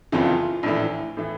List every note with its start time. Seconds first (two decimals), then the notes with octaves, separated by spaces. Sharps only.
0.12 F#1 F2 C#3 E3 F4
0.63 A#1 A2 E3
1.17 A2 E3